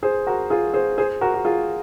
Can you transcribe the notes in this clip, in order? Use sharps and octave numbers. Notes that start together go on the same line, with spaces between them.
G#4 C5
F#4 A#4
F4 G#4
G#4 C5
G#4 C5
F#4 A#4
F#4
F4 G#4